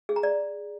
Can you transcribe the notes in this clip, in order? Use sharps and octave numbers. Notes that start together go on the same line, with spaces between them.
G#4
A#5
D5